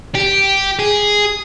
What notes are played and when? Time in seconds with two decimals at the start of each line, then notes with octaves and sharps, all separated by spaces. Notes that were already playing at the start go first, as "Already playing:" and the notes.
0.15 G4
0.79 G#4